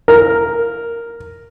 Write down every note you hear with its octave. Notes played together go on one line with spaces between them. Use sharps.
A#4